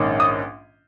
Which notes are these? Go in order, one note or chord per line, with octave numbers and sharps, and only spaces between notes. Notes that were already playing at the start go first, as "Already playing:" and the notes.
Already playing: A#1 G#2 D#3 C#4
D#6